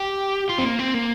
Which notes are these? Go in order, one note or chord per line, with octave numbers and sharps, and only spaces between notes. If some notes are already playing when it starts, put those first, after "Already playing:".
Already playing: G4
F4
C4
A#3
C4
A#3